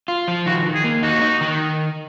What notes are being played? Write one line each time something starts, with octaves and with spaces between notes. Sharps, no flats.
F4
F3
D#3 F#4
D#3
G#4
A#3
D#4 F#4
D#4
D#3